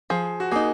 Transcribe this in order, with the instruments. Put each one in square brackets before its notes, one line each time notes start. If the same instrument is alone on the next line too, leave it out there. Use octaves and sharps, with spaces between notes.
[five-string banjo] F3 [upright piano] G#4
[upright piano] F#4
[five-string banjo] A#3 D#4 [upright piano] G#4